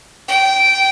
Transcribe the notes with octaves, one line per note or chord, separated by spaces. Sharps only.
G5